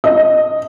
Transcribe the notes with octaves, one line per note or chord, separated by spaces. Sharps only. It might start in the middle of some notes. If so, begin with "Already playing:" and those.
D#5